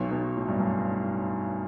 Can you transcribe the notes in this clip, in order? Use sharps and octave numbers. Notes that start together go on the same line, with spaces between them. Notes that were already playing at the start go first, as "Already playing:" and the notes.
Already playing: B1 B2
B1 B2
A2
G2
F#2